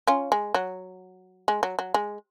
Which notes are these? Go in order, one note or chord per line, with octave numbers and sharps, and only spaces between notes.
C#4 F4
G#3
F#3
G#3
F#3
F#3
G#3